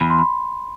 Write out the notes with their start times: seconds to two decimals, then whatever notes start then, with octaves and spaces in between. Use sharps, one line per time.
0.01 E2 B5
0.10 C6
0.18 B5